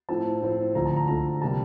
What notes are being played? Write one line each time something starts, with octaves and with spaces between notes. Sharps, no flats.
A2 F3 C4 A5
A2 F3 C4
D2 D3 F3 A#5
A5
A#5
D2 D3 F3 A#5
C3 G3 A#3 A5